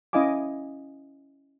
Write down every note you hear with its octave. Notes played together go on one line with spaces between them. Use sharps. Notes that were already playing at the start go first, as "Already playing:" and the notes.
C#4 E4 D#5 F5 G#5 D6